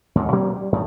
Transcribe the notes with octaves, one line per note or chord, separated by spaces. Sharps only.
D#2 G#2 D#3
B2 F#3 A#3 C#4
G3
F#2 A2 D#3